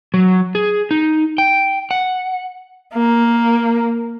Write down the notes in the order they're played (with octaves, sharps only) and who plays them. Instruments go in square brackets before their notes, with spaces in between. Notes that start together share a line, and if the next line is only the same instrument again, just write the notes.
[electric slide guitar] F#3
G#4
D#4
G5
F#5
[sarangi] A#3